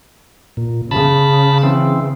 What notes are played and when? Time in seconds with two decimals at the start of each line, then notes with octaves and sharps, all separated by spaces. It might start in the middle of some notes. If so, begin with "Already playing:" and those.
0.57 A#2
0.91 C#3 A5 B5
1.63 E3 C4